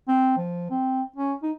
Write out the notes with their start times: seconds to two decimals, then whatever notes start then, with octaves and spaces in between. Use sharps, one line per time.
0.08 C4
0.37 F3
0.71 C4
1.16 C#4
1.42 D#4